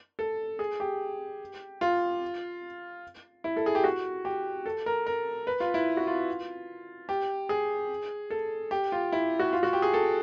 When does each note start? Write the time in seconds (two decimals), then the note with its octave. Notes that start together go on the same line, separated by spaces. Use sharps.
0.19 A4
0.59 G#4
0.80 G4
1.81 F4
3.44 E4
3.57 A4
3.66 G#4
3.75 G4
3.84 F#4
4.25 G4
4.66 A4
4.86 A#4
5.07 A#4
5.47 B4
5.60 F4
5.74 E4
5.97 F#4
6.07 F4
7.09 G4
7.49 G#4
8.31 A4
8.71 G4
8.92 F4
9.12 E4
9.40 F#4
9.53 F4
9.63 F#4
9.73 G4
9.82 G#4
9.94 A4